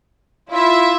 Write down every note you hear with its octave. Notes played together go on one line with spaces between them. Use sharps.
E4 F4 E5